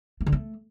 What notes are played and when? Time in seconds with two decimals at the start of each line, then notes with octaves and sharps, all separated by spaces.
0.21 A3
0.26 D3
0.32 A3